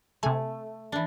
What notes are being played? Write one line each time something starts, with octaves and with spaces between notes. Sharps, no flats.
C3 A3 G#5
E3 D4